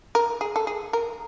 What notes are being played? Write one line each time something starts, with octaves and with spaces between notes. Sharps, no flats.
A#4
G#4
A4
G#4
A#4